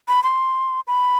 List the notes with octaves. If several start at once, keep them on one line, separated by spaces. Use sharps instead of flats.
B5
C6
B5